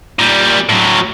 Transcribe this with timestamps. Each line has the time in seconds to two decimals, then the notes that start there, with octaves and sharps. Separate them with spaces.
0.19 A#2 G3
0.69 A2 F#3